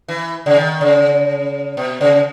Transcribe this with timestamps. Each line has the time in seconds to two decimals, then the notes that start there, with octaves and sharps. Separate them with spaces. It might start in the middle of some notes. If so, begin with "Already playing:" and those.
0.08 E3
0.46 C#3
0.56 D#3
0.81 C#3
1.77 B2
2.01 C#3